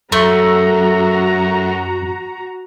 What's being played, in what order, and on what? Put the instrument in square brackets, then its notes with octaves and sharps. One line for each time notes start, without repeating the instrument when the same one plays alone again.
[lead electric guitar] F#2 [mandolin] A3 [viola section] F#4 A#5